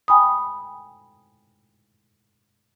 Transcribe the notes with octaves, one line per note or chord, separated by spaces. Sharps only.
G5 G#5 B5 D#6